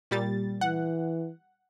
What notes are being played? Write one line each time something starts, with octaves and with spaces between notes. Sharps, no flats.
A#2 G3 A6
E3 F#5